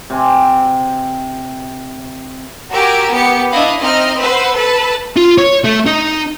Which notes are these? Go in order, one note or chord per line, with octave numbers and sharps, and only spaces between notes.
C3 C4 G#5
F#4 G4 A#4 G#5 E6 D7
B3 G4 C#7
D4 E4 D#5 F5 B5
C4 D#4 D#5 E5 F6
B4 C5 F#5 E6
A4 B4 A5
F4
C#5
A3
D#4